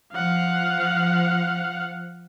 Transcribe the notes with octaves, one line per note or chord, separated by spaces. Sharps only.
F3 F5 F#5